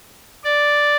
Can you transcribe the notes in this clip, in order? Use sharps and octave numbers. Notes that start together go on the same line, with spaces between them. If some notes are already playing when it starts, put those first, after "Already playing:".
D5